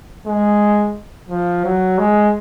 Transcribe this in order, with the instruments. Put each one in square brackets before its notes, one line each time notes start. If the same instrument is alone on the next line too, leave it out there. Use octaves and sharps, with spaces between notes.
[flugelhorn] G#3
F3
F#3
G#3